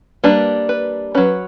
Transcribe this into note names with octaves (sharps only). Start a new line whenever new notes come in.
G3 A#3 D4 B4
B4
F#3 C#4 B4